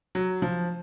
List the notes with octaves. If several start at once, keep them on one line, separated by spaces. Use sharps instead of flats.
F#3
F3